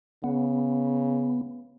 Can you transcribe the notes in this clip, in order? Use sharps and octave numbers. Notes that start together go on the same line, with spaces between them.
C#3 B3